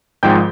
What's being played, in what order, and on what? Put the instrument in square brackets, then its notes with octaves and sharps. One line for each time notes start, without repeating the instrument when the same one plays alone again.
[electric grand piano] G#1 G#2 F3 G#3 G5 G6